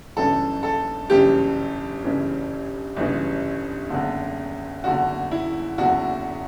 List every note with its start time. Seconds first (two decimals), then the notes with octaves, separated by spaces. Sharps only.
0.16 G1 F#2 C#3 E3 A4
0.63 A4
1.10 G1 F#2 C#3 E3 G4
2.04 G1 F#2 C#3 E3
2.96 G1 F#2 C#3 E3
3.90 F#1 E2 D3
4.84 F#1 E2 D3 F#4
5.31 E4
5.78 F#1 E2 D3 F#4